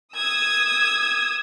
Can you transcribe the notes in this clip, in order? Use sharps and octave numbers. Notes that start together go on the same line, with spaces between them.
D#6 E6 G#6